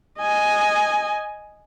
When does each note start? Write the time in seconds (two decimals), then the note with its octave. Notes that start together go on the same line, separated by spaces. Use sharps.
0.20 D#5 G#5